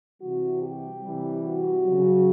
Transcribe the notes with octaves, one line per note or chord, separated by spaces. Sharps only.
C3 E3 G3 F#4
G4
C3 E3 G3
F#4
C#3 F#3